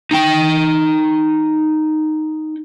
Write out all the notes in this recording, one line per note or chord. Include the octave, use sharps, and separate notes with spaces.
D#4 G5